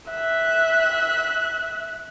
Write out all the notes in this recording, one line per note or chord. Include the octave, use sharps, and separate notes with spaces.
E5 F#6